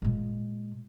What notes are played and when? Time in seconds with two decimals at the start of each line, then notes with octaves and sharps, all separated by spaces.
0.02 A#2 G#3